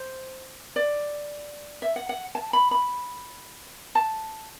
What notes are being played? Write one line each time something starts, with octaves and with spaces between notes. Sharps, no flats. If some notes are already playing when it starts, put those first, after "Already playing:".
Already playing: C5
D5
E5
F#5
F#5
A5
B5
B5
A5